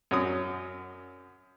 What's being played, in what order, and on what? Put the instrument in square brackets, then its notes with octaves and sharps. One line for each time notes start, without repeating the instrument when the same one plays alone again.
[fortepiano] F#2 F#3 D#6